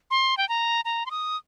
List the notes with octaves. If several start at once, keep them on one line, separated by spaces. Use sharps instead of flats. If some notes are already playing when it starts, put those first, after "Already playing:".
C6
G5
A#5
A#5
C6
D#6